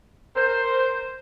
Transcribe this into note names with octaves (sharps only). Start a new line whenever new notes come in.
A#4 C5